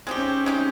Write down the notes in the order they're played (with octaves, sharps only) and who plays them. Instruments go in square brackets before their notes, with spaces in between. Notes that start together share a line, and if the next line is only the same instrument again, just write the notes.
[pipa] G#3 D#4 G4 [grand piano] C4
[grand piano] C#4
C4
[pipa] G#3 D#4 G4